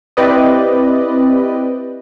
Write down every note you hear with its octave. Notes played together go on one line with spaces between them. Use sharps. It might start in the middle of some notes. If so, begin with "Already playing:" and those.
C4 E4 G4 B4 D5 D#5